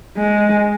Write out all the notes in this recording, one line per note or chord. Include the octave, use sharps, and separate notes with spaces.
G#3